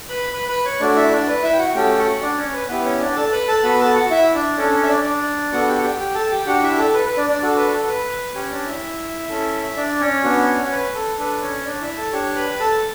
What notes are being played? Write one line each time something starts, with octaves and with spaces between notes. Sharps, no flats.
B4 B5
B4 B5
B4 B5
C#5 C#6
A3 D4 F#4 D5
E4 E5
D4 D5
B4
E4 E5
G5
F#4 F#5
A3 C#4 F#4 G4 A4 G5
F#4 F#5
D4 D5
C#4 C#5
B4
B3 E4 G4 B4
C#4 C#5
D4 D5
A4 A5
B4 B5
A4 A5
B3 F#4 A4 B4 B5
A4 A5
F#4 F#5
E4 E5
D4 D5
C#4 D4 A4 C#5
C#4 C#5
E5
D4 D5
D4 D5
B3 D4 F#4 A4 F#5
G4 G5
F#5
G4 G5
G4 G5
A4 A5
G4 G5
D4 F#4 G4 F#5
E4 E5
A4
B4
B4
D4 D5
D4 D5
D4 F#4 A4
B4
A4
B4
C#4 G4 C#5
D4 D5
E4 E5
C#4 E4 A4
D4 D5
C#4 C#5
B3 D4 F#4
B4
A4
D4 A4 B4
C#4 C#5
D4 D5
E4 E5
A4 A5
D4 G4 C#5 C#6
B4 B5
A4 A5